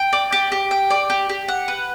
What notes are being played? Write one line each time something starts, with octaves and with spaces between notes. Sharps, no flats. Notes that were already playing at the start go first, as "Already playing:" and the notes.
Already playing: G5
D5
G4
G4
G5
D5
G4
G4
F#5
B4